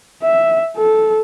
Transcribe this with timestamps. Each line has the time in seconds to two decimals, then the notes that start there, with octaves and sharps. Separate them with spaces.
0.23 E5
0.77 A4